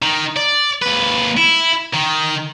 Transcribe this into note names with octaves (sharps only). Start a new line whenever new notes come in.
D#3
D5
D#2 B4
E4
D#3